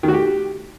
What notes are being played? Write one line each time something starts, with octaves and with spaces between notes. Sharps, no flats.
D#3
F#4
G4